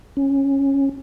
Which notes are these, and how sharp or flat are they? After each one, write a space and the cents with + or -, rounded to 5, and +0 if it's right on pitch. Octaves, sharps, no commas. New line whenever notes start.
C#4 -10